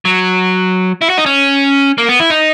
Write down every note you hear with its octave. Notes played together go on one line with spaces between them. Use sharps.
F#3
E4
F#4
D#4
C#4
A#3
B3
E4
D#4